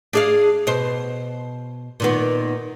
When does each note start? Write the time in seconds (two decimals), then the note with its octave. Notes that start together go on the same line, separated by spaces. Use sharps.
0.13 D4 G#4 F5
0.67 B2 C5
2.00 A#2 D#3 B3